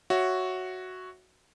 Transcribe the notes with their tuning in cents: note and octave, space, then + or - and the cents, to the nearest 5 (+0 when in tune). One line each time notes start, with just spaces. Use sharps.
F#4 +0 C#5 +0 E5 +0